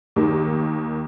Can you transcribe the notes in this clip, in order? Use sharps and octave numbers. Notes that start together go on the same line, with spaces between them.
D#2 D#3